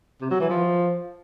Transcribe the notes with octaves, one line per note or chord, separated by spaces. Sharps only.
C3
F#3
E3
F3